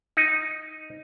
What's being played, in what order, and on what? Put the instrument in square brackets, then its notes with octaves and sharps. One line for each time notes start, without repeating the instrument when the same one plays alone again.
[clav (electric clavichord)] D#4